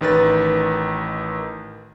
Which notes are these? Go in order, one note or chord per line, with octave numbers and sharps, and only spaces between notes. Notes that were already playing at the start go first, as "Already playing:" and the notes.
A1 D#3 B4 A6